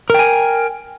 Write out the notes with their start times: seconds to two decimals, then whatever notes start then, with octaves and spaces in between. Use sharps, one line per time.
0.10 A#4
0.14 G5
0.19 G#5